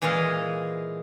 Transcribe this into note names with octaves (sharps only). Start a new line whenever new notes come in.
A#2 E3 G#3 G#4 D#5 F5